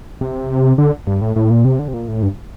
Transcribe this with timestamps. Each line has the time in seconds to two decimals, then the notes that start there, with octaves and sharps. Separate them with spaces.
0.21 C3
0.78 D3
1.07 G2
1.21 A2
1.36 A2
1.50 A#2
1.65 C3
1.79 D3
1.88 C3
1.94 A#2
2.08 A2
2.23 G2